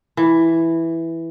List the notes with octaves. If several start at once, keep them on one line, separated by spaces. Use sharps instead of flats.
E3